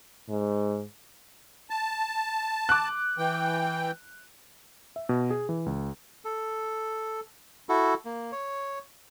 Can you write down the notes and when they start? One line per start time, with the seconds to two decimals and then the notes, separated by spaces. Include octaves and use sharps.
0.29 G#2
1.70 A5
2.69 D6 F#6
3.18 E3 G5
4.96 E5
5.09 B2
5.31 G#4
5.49 E3
5.66 C#2
6.25 A4
7.69 E4 F#4 A4
8.05 A#3
8.32 C#5